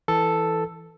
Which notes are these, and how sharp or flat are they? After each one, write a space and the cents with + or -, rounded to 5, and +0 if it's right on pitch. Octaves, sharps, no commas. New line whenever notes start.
E3 +0 A4 +0